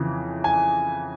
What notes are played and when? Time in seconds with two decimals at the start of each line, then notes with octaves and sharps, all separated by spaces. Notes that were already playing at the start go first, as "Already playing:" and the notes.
Already playing: F2 C#3 E3
0.44 G#5